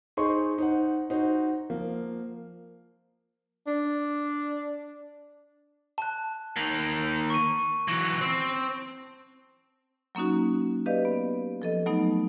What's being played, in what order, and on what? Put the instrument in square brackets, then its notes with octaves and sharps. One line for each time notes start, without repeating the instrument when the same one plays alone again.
[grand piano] D#4 G#4 C5 D#5 C6 C#6
D#4 C5 F#5
D#4 F#4 C5
F3 A#3
[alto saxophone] D4
[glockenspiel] A5 F#6
[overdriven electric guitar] D#3 A#3
[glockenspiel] C#6 D#7
[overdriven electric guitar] E3 F#3 [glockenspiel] A#6
[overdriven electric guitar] C4
[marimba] F#3 A#3 C#4 D#4 F#4
G4 B4 D5 D#5 F5
B3
F3 A4 D#5
F#3 A3 B3 D#4